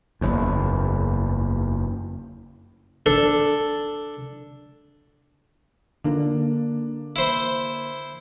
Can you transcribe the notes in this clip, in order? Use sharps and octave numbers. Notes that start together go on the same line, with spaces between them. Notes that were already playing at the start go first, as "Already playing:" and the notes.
F#1 E2
D4 A4
D3 A#3 D4
E4 C5